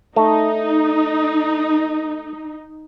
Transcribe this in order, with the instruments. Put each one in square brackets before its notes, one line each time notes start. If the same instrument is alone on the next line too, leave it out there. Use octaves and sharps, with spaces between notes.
[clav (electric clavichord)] A3 [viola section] D#4